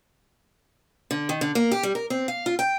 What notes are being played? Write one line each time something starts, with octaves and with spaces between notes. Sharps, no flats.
D3
D#3
D3
A#3
G4
G3
A#4
C4
F5
F4
G5